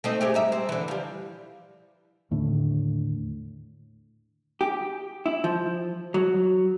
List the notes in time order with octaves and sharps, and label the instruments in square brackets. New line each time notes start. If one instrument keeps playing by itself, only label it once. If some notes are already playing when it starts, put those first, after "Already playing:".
[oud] A3 C4 D#4
A3 G4 G#4
G2 A#4 E5
C4
D3 E3
F3 G3
[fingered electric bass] D#2 A2 D3
[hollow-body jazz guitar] G4
E4
F3
F#3